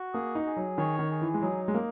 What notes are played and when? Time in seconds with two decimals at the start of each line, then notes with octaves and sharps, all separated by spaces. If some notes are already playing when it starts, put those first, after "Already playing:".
Already playing: F#4
0.13 A#3 G#4
0.35 D#4
0.46 G#4
0.57 F#3
0.78 D#3 C#5
0.99 D#3
1.11 G#4
1.22 E3
1.34 G#3
1.42 F#3 D#4
1.68 G#3
1.75 A#3 D#4